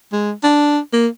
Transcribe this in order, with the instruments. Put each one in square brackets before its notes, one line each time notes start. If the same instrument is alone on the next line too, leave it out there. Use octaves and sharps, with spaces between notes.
[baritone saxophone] G#3
D4
A#3